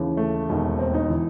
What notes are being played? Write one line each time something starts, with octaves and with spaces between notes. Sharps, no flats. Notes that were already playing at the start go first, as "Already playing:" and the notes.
Already playing: D#2 C#3 E3
A3
E1 D#2 D#3
C4
D#4
E3